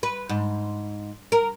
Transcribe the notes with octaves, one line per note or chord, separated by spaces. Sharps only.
B4
G#2
A#4